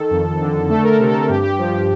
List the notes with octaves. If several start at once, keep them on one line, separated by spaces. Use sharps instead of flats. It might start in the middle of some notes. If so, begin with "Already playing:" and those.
Already playing: D#3 A4
F2
D3
A3 A4
A#4
A4
C3
A4
G2 G4
G4
F3 G4
G4